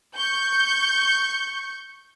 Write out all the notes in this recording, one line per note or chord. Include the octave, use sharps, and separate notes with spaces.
C#6 G6